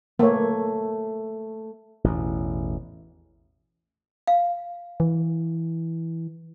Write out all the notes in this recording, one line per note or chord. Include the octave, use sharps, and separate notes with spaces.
A3 A#3 C#5
A1 E2 B2
F5
E3